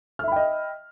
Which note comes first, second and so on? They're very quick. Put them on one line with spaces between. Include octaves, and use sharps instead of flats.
F6 E5 B5 G5 D#5